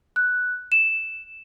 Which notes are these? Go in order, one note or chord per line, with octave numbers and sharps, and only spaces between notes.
F#6
E7